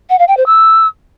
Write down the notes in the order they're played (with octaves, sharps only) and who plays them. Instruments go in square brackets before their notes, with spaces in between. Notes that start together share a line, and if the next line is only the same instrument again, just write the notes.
[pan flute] F#5
F5
G5
C5
E6